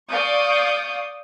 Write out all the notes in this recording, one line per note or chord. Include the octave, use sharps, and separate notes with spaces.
D5 F5 C#6 D#6 G6